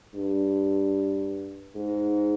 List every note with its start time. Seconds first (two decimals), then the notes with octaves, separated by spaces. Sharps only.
0.14 G2
1.75 G#2